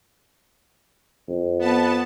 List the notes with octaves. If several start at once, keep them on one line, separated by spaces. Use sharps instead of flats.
F2
B3 A5